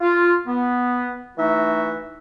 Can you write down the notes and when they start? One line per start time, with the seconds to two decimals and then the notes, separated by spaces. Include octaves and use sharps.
0.01 F4
0.46 B3
1.38 E3 A3 D#4 F#4 E5